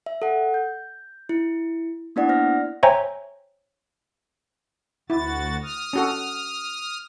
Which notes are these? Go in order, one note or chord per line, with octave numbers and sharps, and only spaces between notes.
E5
A4 F#5
G6
E4 C#7
A#3 B3 D4 E4 D5 F#5
C5 F6 A#6
C5 C#5 E5 G5 G#5 A#5
D2 E4 F#4 A6
D#6 F6
C#4 F#4 A4